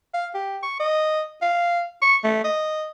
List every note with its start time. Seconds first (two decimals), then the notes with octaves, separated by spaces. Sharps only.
0.14 F5
0.34 G4
0.63 C#6
0.79 D#5
1.42 F5
2.02 C#6
2.24 A3
2.44 D#5